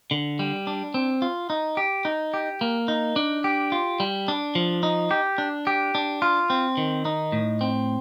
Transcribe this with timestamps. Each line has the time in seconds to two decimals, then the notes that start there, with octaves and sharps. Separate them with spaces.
0.11 D3
0.39 G3
0.67 D4
0.94 C4
1.22 F4
1.50 D#4
1.77 G4
2.05 D#4
2.34 G4
2.61 A#3
2.88 D#4
3.16 D4
3.44 G4
3.72 F4
4.00 G3
4.28 D4
4.55 F3
4.83 D#4
5.11 G4
5.38 D4
5.67 G4
5.95 D4
6.22 F4
6.50 C4
6.77 D#3
7.05 D#4
7.32 A2
7.61 C4